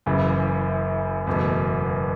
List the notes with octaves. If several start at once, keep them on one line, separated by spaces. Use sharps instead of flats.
F#1 F#2 C#3 E3
F#1 E2 B2 A3